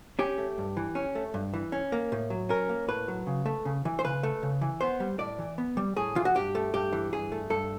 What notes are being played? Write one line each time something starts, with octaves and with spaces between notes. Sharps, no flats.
C#4 G4
A3
G2
E3
C#4
A3
G2
E3
C#4
A#3
A2
F#3
C#4 A#4
A#3
A2 B4
F#3
C#3
A3
C#3
E3
C5
C#3 B4
A3
C#3
E3
B3 C5
G3
A2 D5
E3
B3
G3
A2 G#4
E3 F4
F#4
G2 G4
A3
G2 G4
E3
G2 G#4
A3
G2 A4